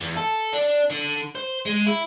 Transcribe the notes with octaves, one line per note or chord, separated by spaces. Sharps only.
E2
A4
D4
D3
C5
G#3
E4